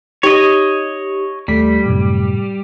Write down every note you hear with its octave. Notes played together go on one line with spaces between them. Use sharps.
D#4 G4 C#5 D#5
D#2 G3 A3 B6
F#2 A2 C3